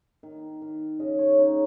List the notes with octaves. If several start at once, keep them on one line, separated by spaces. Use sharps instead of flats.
D#3
D#3
C#3 D#5
C#5
C#3 D#4